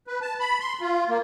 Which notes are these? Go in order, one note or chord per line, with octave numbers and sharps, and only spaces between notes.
B4
A5
B5
C6
F4
A#3